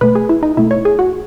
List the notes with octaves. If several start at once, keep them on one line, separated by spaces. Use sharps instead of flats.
B2 A3 B4
G#4
E4
D#4
B2 A3 E4
C#5
G#4
F#4